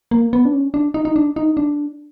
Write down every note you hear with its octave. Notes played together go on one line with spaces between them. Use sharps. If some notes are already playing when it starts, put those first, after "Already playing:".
A#3
B3
D4
C#4
D4
D#4
D#4
D4
D#4
D4